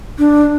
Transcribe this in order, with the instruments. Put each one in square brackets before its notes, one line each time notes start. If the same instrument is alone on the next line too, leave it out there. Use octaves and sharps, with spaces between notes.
[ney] D4